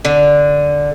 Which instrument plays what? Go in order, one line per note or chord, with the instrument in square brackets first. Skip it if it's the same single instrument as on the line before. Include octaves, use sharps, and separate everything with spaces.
[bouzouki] D3